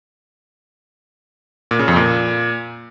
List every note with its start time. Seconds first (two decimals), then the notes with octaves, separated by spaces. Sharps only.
1.71 A#2
1.79 C#3
1.88 F2
1.96 A#2